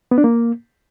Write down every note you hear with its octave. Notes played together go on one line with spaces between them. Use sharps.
B3
D4
A#3